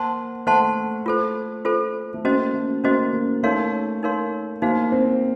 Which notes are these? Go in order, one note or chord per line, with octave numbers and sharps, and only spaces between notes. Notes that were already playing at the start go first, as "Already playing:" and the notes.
Already playing: A#3 C5 F#5 A5 C6
A3 C5 F#5 A5 C6
F4 A4 C5
F4 A4 C5
A3
A#3 C#4 F#4 C5 D#5
A3
A#3 C#4 F#4 C5 D#5
A#3
A3 D#4 A#4 C#5 F5 C6
D#4 A#4 C#5 F5 C6
A#3 D#4 F#4 C5 F5
C4